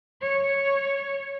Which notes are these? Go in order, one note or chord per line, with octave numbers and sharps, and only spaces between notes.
C#5